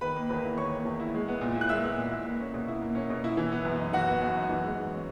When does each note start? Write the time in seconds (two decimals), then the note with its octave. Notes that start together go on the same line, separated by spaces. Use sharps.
0.01 D#3 B4 B5
0.16 A#3
0.29 E2 B4 B5
0.44 E4
0.57 D#3 C#5 C#6
0.72 A#3
0.85 E2
1.00 E4
1.14 G#3
1.28 B3
1.41 A#2
1.55 E4
1.61 F#6
1.69 G#3 E5 E6
1.83 B3
1.98 A#2
2.11 E4
2.26 A#3
2.40 C#4
2.54 B2
2.68 E4
2.82 A#3
2.95 C#4
3.10 B2
3.24 E4
3.37 E3
3.52 B3
3.65 F#2
3.79 D#4
3.93 E3 F#4 F#5
4.08 B3
4.22 F#2
4.36 D#4
4.50 E3
4.64 G#3
4.77 G#2
4.92 C#4